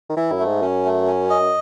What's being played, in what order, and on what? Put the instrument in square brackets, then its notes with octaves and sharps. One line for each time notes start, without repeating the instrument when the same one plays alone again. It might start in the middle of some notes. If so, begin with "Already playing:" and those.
[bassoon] D#3
[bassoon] E3 [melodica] E4
[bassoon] F#2
[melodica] A3
[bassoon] G#2
[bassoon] F#2 [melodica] C#4
[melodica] A3
C#4
D#5